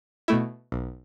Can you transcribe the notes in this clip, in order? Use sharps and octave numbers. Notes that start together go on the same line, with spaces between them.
B2 A3 E4
B1